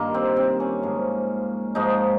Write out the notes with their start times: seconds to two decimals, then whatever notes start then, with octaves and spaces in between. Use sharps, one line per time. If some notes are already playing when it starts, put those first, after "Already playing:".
Already playing: G2 D#3 A#3 F4
0.14 C4
0.37 C4
0.60 C#4
0.83 G#2 F3
1.75 G#2 F3 D#4